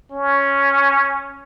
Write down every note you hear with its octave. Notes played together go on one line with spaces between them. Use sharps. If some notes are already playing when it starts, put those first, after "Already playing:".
C#4